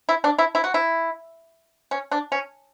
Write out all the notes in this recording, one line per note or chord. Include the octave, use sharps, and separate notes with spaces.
E4
D4
E4
E4
F#4
E4
C#4
D4
C#4